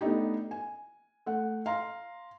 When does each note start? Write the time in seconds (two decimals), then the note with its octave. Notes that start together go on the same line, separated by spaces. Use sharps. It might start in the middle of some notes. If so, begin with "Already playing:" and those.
0.01 A3 B3 D4 D#4 G4
0.51 G#5
1.26 A3 F#5
1.66 F5 A#5 C6